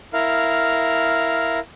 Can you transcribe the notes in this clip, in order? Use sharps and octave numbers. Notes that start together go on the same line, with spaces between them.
E4 A#4 F5